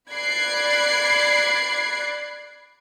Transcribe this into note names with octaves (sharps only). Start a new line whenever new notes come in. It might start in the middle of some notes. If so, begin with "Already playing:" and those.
D5 B5 F#6 G#6 C7 D7